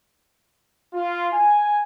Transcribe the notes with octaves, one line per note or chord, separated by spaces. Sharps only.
F4
G#5